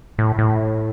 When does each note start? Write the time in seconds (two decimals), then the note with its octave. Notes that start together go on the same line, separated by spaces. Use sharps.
0.18 A2
0.38 A2